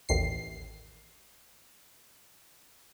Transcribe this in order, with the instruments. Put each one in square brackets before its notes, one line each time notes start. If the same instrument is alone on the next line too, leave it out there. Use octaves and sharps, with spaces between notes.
[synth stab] A1 D#2 C7